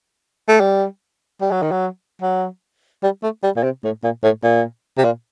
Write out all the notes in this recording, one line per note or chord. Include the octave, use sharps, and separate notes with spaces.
A3
G3
G3
F#3
D#3
F#3
F#3
G3
A3
G3
A#2
C3
A2
A#2
A2
A#2
C3
A#2